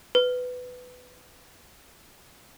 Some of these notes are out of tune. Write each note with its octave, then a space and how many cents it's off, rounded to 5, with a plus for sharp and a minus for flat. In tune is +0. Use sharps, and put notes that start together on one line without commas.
B4 +15